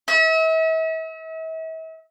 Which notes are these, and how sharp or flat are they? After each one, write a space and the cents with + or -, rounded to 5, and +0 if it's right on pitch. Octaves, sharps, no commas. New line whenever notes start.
E5 -40